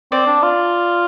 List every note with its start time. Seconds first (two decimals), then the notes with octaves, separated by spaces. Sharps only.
0.12 C4 D5
0.27 D4
0.43 F4